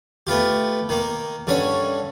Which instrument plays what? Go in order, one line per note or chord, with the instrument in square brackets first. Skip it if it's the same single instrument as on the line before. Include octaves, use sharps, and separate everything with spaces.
[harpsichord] A3 B3 F4 G4
D#3 A#3
G2 D3 C#4 C#5